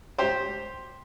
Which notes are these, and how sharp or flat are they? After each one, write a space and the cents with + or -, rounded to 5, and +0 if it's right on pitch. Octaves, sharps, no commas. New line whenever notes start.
G4 +0 C5 +5